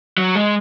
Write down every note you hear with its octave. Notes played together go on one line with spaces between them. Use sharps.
F#3
G#3